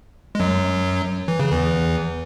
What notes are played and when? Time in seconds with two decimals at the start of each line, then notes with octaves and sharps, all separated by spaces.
0.35 G#3
0.40 F#2 F#3
1.28 E3
1.39 C#3
1.51 E2 E3